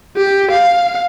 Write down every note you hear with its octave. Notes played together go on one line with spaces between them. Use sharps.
G4
F5